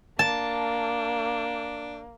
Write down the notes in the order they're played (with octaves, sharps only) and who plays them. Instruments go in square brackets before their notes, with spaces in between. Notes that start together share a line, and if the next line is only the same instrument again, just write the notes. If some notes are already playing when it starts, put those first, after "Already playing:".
[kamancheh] A#3 [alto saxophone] D4 [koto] A5